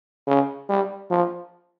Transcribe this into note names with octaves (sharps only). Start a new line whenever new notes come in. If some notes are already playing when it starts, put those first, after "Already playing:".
C#3
G3
F3